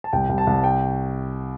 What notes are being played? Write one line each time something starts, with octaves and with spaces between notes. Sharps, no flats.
A5
C2 G5
C2
A5
C2
G5